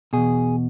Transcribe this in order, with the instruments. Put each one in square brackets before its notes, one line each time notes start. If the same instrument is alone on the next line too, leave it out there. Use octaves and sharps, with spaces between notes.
[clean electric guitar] E2 B2 G#4